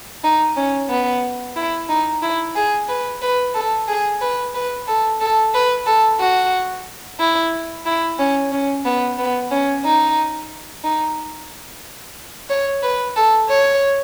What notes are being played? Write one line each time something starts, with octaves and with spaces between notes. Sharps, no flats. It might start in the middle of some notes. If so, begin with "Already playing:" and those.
D#4
C#4
B3
E4
D#4
E4
G#4
B4
B4
A4
G#4
B4
B4
A4
A4
B4
A4
F#4
E4
E4
C#4
C#4
B3
B3
C#4
D#4
D#4
C#5
B4
A4
C#5